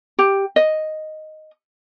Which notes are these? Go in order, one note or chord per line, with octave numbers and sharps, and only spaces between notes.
G4
D#5